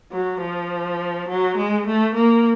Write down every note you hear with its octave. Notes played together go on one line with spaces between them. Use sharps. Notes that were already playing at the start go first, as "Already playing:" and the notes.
F#3
F3
F#3
G#3
A3
A#3